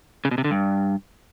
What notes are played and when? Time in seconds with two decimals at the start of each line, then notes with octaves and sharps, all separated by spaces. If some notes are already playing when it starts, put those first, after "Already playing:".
0.25 C#3
0.31 B2
0.38 C3
0.44 D3
0.51 G2